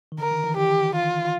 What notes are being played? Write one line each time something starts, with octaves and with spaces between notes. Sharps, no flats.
D#3
D3 A#4
D#3
E3
D#3 G4
F4